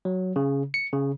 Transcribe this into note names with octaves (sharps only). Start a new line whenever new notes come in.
F#3
C#3
C#7
C#3